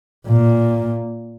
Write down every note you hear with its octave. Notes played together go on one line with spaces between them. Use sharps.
A#2